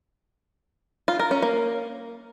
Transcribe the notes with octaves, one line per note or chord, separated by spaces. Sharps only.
F4
A#4
C#4
A#3